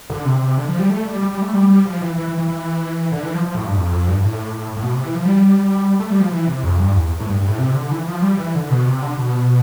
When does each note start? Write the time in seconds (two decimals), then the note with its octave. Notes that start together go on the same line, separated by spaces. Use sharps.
0.10 D3
0.25 C3
0.57 D3
0.68 F3
0.79 G3
0.89 A3
1.05 G3
1.21 G3
1.31 G3
1.42 A3
1.53 G3
1.68 G3
1.85 F3
2.01 E3
2.16 E3
2.27 E3
2.38 E3
2.48 E3
3.12 D3
3.23 E3
3.34 F3
3.44 F3
3.55 A2
3.65 G2
3.76 F2
3.92 F2
4.08 G2
4.24 A2
4.77 A2
4.82 B2
4.93 C3
5.04 E3
5.15 F3
5.25 G3
6.00 A3
6.10 G3
6.20 F3
6.31 E3
6.47 C3
6.63 F2
6.79 G2
6.95 E2
7.20 A2
7.26 G2
7.37 G2
7.48 A2
7.58 C3
7.75 D3
7.91 E3
8.07 F3
8.22 G3
8.38 E3
8.55 D3
8.70 B2
8.86 C3
9.02 D3
9.17 B2